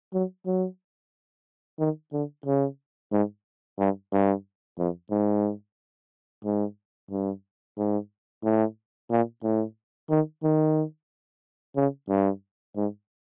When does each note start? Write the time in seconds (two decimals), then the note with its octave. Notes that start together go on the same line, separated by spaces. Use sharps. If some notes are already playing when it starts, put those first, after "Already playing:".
0.14 F#3
0.46 F#3
1.79 D#3
2.13 D3
2.46 C#3
3.12 G#2
3.79 G2
4.12 G2
4.78 F2
5.11 G#2
6.44 G#2
7.11 G2
7.78 G#2
8.44 A2
9.11 A#2
9.43 A2
10.10 D#3
10.43 D#3
11.76 C#3
12.09 G2
12.76 G#2